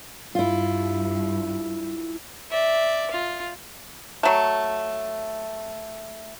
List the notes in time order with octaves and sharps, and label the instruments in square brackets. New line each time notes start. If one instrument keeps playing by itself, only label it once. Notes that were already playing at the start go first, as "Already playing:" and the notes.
[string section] G2 [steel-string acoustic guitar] E4 F4
[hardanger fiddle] D5 E5
F4
[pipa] F#3 A3